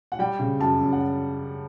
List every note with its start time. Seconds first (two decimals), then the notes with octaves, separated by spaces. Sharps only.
0.12 F#5
0.19 G3 G5
0.39 C#3
0.59 F#2 A5
0.81 F#2
0.92 F#5